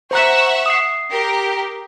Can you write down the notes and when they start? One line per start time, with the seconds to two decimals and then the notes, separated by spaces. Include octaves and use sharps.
0.11 C5 E5 F#5 A#5 C#6 F#6
0.66 D#6 C7
1.11 G4 A#4